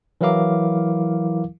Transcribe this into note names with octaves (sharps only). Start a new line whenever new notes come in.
E3 F#3 E4 A#4 F5 D6